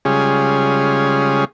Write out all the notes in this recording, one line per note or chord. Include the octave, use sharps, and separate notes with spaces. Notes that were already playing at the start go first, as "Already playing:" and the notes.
C#3 G3 G#3 C#4 F4 G#4